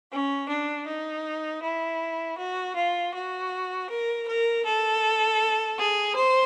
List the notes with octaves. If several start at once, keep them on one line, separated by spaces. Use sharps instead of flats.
C#4
D4
D#4
E4
F#4
F4
F#4
A#4
A#4
A4
G#4
C5